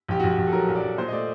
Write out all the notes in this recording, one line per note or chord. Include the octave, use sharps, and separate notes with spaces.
A#1 G4
A#1 F#4
G4
A#1
A4
F#3 A#4
A#1
D5
A#1
A#2 C5
D#5
A3 D5